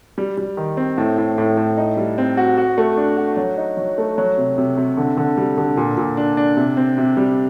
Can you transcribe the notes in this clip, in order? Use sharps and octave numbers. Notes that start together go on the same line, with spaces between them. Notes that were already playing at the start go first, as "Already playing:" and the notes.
G3
G3
D#3
C4
A2
A2
A2
A2
D#4
G3
C4
F#4
F#4
A3
D4
F#4
F#3
D#4
F#3
A3
F#3
C3
C3
C3
D3
D3
G3
D3
A#2
A#2
D4
D4
C3
C4
C3
G3